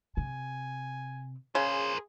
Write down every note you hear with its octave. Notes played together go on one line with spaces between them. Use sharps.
C3 G#5
C#3 G#4 A#4 C5